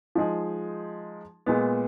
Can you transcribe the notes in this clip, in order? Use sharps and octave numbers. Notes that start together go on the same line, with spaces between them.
F3 G#3 D#4 G#4
A#2 G#3 B3